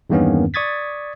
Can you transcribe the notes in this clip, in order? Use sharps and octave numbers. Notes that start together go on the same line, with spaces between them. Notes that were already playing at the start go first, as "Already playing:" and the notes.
E2 G2 D#3 A#3 B3 C#4
D5 C#6 D#6 G#6 A6 B6